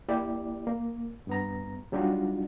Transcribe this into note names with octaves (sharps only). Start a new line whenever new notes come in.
A#3 E4 G4 D5
A#3
G2 B3 A#5
F#3 G3 D4 D#4 F4 F#4